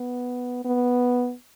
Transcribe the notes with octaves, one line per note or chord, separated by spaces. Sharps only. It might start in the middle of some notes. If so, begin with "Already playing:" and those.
Already playing: B3
B3